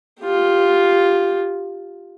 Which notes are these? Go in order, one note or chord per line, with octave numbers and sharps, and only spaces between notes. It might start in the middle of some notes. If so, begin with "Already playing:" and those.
F4 G4